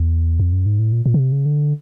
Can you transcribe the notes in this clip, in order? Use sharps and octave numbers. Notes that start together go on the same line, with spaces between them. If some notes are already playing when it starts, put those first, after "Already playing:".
Already playing: E2
F2
F#2
G#2
A2
A#2
A#2
C#3
C3
C#3
D3